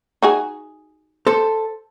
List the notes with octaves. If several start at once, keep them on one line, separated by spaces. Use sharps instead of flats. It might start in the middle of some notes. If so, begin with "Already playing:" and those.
D#4 F#4 G#4
A4 C5